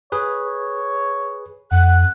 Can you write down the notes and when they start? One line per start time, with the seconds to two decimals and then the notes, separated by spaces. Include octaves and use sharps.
0.12 G#4 B4 C#5
1.71 F2 F#5 F#6